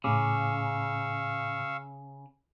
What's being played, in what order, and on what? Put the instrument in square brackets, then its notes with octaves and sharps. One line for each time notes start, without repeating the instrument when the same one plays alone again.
[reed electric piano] A2 D6 [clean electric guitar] C#3 [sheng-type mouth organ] F5 C#6 E6